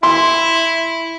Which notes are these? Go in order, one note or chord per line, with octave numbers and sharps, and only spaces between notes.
E4 C6